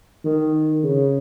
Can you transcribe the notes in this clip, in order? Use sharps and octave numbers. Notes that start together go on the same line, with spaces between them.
D#3
C#3